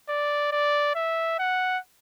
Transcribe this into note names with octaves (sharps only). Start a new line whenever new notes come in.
D5
D5
E5
F#5